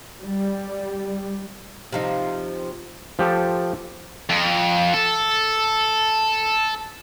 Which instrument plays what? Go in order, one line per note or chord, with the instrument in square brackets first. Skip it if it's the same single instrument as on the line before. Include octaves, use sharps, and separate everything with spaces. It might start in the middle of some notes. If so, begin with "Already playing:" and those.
[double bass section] G3
[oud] C3 F3 D#4
[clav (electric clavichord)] F3 G4 A4
[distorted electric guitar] F2
A4